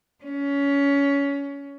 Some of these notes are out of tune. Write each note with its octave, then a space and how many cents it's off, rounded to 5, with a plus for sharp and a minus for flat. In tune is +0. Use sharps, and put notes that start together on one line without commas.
C#4 +20